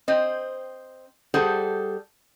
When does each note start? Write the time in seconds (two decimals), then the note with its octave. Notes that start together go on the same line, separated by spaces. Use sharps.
0.08 C4 C5 D#5
1.34 G3 G#4 A4 C5 F#5